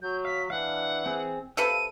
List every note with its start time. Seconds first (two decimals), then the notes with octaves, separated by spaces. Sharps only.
0.02 F#3 G6
0.25 F5 B6
0.50 E3 D4 F5 F#5
1.06 C4 G#4
1.57 C3 A4 B4 F5 E6 D#7